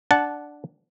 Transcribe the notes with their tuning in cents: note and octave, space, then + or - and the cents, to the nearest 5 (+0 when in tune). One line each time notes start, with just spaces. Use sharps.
D4 +0 F#5 +0 A5 -15